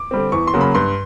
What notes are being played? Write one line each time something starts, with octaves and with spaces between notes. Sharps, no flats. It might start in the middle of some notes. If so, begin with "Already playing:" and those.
Already playing: D6
D3 G3 C4
E2 C#6
C6
C#3 F#3 A#3
B5
G2 C6